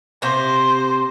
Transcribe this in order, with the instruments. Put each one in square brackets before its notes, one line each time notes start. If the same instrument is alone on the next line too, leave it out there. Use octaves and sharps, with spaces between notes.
[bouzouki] C3 A#3 [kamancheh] C5